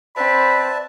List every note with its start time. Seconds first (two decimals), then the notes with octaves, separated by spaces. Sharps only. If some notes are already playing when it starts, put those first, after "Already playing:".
0.17 C4 B4 D5 E5 A5 B5